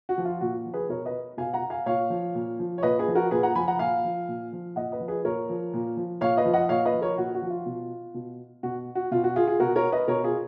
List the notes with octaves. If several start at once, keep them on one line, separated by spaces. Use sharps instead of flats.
F#4
F3
F4
A#2 F#4
F3
G#4 B4
B2 A#4 C#5
B4 D#5
B2 F5 G#5
F#5 A#5
F5 G#5
A#2 C#5 F5
F3
A#2
F3
C#5
A#2 B4 D#5
G#4 B4
F3
F#4 A#4
A#2 G#4 B4
F#5 A#5
F3 G#5 B5
F#5 A#5
A#2 F5 G#5
F3
A#2
F3
A#2 D#5 F#5
B4 D#5
F3
G#4 B4
A#2 A#4 C#5
F3
A#2
F3
A#2 C#5 F5
B4 D#5
F3
D#5 F#5
A#2 C#5 F5
B4 D#5
F3
A#4 C#5
A#2 F#4
F#4
F3
F4
B2
B2
B2 F#4
F#4
B2 F4
F#4
F4 G#4
F4 G#4
B2 F#4 A#4
A#4 C#5
B4 D#5
B2 A#4 C#5
F4 G#4